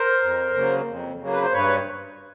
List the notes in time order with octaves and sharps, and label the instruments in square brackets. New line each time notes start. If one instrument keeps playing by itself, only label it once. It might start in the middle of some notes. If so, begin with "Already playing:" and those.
Already playing: [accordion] A#4 C5
F2
C#3 F#3 A#3
F2
C#3 F#3 A#3
B4
C5
G2 B4 C#5